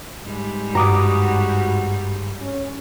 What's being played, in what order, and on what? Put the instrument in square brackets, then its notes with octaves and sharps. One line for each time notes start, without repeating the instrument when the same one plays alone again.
[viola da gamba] G#2 G3
[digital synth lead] G2 [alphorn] F#4 [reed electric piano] A#5 D6 D#6
[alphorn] C#4